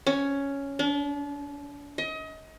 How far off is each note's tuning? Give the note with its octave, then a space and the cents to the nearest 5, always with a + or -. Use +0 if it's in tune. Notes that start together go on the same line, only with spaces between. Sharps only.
C#4 +5
D4 -40
D#5 +30